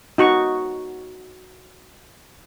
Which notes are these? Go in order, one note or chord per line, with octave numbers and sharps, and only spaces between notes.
D#4 F#4 C#6